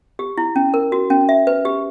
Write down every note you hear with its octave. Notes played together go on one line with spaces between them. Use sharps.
G4
E4
C#4
A#4
F#4
C#4
E5
B4
G4